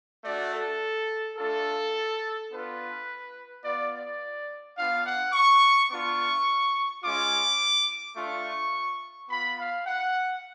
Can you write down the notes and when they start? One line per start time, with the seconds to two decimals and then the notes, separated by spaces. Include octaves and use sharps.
0.24 A3 D4 F#4 D5
0.53 A4
1.37 A3 D4 F4 A4
2.51 B3 D4 F4 B4
3.63 B3 F4 D5
3.92 D5
4.76 B3 D4 F4 F5
5.05 F#5
5.33 C#6
5.89 B3 D4 F4 C#6
7.03 G#3 C#4 F4 D6
8.16 A3 D4 F4 C#6
9.29 B3 F4 B5
9.58 F5
9.86 F#5